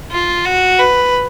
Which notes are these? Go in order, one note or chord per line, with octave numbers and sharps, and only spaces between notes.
F4
F#4
B4